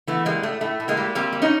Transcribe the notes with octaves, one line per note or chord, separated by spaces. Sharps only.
E3 A3 B3
G3 G#3 A#3
A2 A3
A2 A3
A2
G#3 A#3
G3
G3 A#3 C4
G3
C#4 D#4